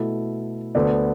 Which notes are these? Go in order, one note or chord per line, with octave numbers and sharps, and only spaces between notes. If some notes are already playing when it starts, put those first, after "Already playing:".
Already playing: B2 A3 E4 A4
D2 D3 B3 A4 D5